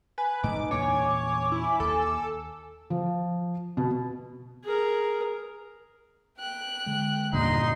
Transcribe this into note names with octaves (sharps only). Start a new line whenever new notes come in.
B4 G#5
G#2 A3 D#4 D6
E2 A#2 D4 C#5 G#5 D6
E4
D#2 A4
F3
B2
G#4 A#4
G5 F#6
D3 G#3
E2 G2 A#2 D3 D#4 C6